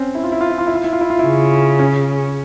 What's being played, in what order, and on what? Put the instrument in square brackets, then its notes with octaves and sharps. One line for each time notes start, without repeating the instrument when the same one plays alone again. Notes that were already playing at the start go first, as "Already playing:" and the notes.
Already playing: [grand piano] C4 C#4
E4
F4
E4
F4
E4
F4
E4
F4
E4
F4
E4
F4
E4
[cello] C#3
[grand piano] C#4